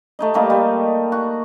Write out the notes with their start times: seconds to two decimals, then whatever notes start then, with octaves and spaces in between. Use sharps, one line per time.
0.19 A3 D#4 D#5
0.34 G3 A3 A#3 D#4
0.50 G3
1.12 F#4